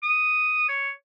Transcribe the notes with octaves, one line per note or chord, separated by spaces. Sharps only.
D#6
C#5